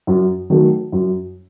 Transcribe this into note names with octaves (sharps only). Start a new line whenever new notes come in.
F#2
D#3 F#3 A3
F#2